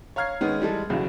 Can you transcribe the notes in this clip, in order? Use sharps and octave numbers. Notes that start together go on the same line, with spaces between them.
C#5 F5 A#5 F6 G#6 C7
D#3 G#3 B3 C#4
E3 G3 G#3 A4
B1 E2 C#3 F#3